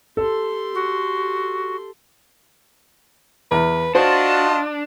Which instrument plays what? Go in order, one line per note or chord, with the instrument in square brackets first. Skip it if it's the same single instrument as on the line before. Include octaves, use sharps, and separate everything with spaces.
[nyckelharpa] G4 C6 [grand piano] A4
[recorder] F#4
[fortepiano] E2 [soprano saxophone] B4
[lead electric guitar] D4 [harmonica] F4 D#5 A5 [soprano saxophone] F#4 [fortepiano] C5